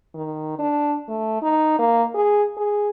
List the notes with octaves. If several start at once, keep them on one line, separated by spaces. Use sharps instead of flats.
D#3
D4
A3
D#4
A#3
G#4
G#4